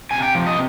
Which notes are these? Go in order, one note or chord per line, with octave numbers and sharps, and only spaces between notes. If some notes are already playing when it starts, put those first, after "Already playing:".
C3 G#5
G5
F3
D#5